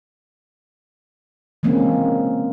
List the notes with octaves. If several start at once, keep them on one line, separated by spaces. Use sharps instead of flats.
E3 G#3 A#3 C4 C#4